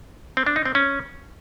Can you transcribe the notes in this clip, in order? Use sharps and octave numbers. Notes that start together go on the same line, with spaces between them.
C4
D4
D#4
C4
C#4